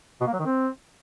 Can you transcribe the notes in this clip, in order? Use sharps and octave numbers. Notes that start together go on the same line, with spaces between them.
B2
A#3
F#3
D#3
C4